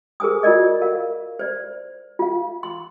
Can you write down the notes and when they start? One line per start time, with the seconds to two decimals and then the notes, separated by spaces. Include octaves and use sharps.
0.20 G#4 A#4 C5 G#5 D#6
0.43 F4 F#4 A#4 D5 D#5
0.81 A#4 F5
1.39 C5 D5
2.19 F4 F5
2.63 C6